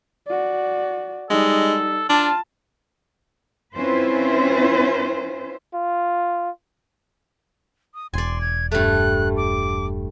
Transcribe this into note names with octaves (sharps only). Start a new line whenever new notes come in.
F#4 D5
G3 G#3 D#4 A4
D4 F4 A5
C4 C#4 E4 F4 B4 C5
F4
D#6
E1 D5 G#5 C6
G#6
G2 A3 F#6
D6